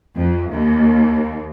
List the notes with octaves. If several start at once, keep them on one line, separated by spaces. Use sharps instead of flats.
F2
D#2